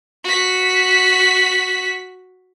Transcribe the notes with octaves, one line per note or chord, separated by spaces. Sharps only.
F#4 B6